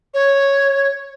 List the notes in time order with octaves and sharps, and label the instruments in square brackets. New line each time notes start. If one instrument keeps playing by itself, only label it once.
[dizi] C#5